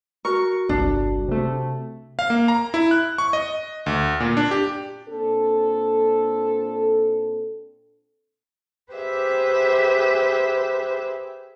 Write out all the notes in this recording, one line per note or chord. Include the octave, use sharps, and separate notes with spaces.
F#4 A#4 C#6
G1 C2 D4
C3 A3
F5
A#3
A#5
E4
F#6
C#6
D#5
D2
A#2
D4
G4
A#2 C4 D4 A4
G4 G#4 B4 C5 E5